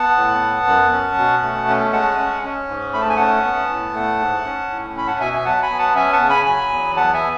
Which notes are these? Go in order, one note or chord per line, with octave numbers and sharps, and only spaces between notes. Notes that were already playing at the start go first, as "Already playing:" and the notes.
Already playing: B3 F#5 A5
A2
B3
F#2
C#4
B2
A3
C#4
G#3 F#5 A5
C#4
C#4
G#2
A3 B5
A5
G#5
C#4 F#5 A5
B3
A2
A3
G#2
C#4
A2
C#4 B5
F#5 A5
B2 E5 G#5
E5 G#5
F#3 F#5 A5
G#5 B5
B3
F#5 A5
C#4 E5 G#5
F#5 A5
C#3
G#5 B5
F#3 G#5 B5
E2
B3 F#5 A5
E5 G#5